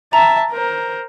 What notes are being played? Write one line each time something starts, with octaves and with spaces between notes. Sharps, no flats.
E5 A5 A#5
A#4 C5